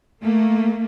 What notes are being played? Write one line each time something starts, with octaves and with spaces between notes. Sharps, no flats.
A3 A#3